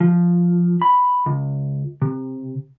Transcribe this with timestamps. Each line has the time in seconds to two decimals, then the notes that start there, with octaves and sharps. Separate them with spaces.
0.01 F3
0.82 B5
1.26 C#2
2.02 C3